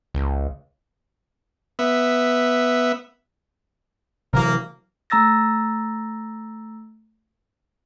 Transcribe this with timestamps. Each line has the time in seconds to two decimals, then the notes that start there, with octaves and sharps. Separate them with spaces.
0.14 C#2
1.79 B3 E5
4.33 C3 E3 F#3 A#3 A#4
5.10 A3 A#5 E6 A6 A#6